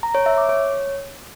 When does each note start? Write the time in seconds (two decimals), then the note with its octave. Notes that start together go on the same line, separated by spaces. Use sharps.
0.03 A#5
0.15 C#5
0.26 E5
0.38 D6
0.49 C#5